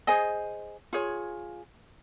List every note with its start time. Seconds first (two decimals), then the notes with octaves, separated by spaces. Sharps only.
0.07 G#4 C5 D#5 G#5
0.93 F4 G#4 C#5